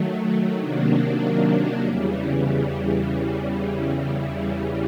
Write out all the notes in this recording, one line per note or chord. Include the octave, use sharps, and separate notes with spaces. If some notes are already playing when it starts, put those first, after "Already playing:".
Already playing: D#3 F#3 A3
C3 D#3 F#3 A#3 D4
E2 C#3 E3 G3